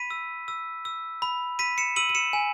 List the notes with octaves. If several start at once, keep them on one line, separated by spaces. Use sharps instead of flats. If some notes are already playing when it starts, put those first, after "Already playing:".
Already playing: B5 B6 D#7
E6
E6
E6
B5
B5 B6 D#7
C#7 E7
E6 D#7 F#7
D#7
C#7 E7
G#5